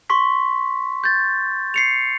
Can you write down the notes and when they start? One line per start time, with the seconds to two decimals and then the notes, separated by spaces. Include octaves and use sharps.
0.10 C6 C#6 B6
1.04 G6 A6
1.74 C7 C#7 F7